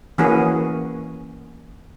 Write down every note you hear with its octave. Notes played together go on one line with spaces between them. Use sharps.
E3 A#3 C#4 F#4 G#4